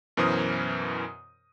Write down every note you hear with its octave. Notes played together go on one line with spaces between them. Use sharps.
F#2 B2 E3 A#4 C5 D#6